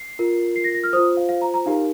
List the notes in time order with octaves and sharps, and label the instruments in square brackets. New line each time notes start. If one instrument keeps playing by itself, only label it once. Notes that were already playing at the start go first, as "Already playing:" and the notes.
Already playing: [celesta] C7
F4 A#4
C7
A#6
A#6
F6
F4 C5 D#6
F5
F5
A#5
A#5
D#4 G4 A#4 F5